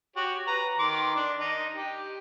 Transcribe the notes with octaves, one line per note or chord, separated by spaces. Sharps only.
F#4 G4 C#5
B4 A#5
D#3 C6 D6
D4
D#4
G4